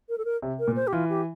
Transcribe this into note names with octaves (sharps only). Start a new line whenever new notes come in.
A#4
A4
A#4
C3
A#4
A#2
C5
G4
E3 F4
G4